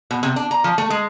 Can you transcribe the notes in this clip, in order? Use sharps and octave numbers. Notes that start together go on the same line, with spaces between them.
B2
C3
D4
A#5
F3
A3
G#3